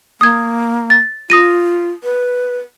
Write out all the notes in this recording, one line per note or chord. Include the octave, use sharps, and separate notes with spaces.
A#3 D#6 G#6
A6
F4 D#6 A#6 D#7
B4